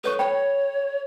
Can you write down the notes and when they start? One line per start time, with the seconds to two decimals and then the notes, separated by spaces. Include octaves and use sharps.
0.04 A4 B4 C#5 C#6
0.19 C5 C#5 G5 B5